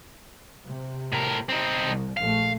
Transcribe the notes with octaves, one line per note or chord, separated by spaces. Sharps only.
C3
A2 A#4
C4 D#4
C2
A#1 A3 F5